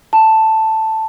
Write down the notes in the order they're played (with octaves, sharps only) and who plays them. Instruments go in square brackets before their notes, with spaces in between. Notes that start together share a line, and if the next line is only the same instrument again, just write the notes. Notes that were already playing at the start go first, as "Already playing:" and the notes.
[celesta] A5